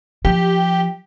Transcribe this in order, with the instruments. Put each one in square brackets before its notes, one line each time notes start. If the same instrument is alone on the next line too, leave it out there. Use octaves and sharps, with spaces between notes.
[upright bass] F3 [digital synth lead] G4